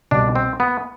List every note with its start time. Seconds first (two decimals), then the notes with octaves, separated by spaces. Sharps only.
0.11 C2 B2 G3 D4
0.35 C4
0.60 B3